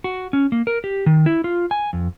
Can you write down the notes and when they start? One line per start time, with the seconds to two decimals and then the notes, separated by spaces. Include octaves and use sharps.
0.04 F#4
0.33 C#4
0.52 A#3
0.67 A#4
0.84 G4
1.06 D#3
1.26 E4
1.44 F4
1.71 G#5
1.93 F2